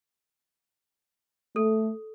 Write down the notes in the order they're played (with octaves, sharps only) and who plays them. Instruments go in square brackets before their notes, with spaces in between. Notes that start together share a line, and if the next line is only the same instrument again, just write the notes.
[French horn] A3 [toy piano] A4